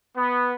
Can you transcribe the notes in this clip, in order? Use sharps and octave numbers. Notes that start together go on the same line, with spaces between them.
B3